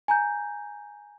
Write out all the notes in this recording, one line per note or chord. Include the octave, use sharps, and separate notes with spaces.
G#5 A#5 G6